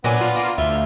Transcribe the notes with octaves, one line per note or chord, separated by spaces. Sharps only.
A#2 F#3 B3 D4 G#5
F4
A#3
D2 F4 E5